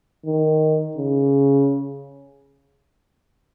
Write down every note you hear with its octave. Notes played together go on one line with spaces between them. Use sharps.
D#3
C#3